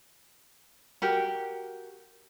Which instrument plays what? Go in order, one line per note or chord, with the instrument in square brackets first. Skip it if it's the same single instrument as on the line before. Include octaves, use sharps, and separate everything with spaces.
[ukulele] F#4 G4 A#4